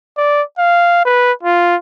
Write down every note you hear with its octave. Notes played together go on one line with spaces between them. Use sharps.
D5
F5
B4
F4